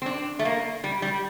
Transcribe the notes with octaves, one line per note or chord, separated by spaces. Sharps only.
C4
D4
A3
A#3
G3
G3